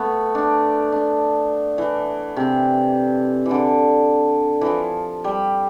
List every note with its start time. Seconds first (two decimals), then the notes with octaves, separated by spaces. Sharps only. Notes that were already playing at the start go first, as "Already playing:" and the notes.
Already playing: A3 B3
0.35 D4
0.92 D4
1.78 E3
2.37 C3
3.46 E3
3.51 D3
4.61 E3
4.67 F3
5.24 G3